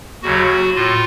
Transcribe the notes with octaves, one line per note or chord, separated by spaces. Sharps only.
D#2 C#3 F#3 F#4
A2 F4